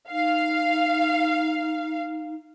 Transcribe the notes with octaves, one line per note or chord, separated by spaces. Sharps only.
D#4 F5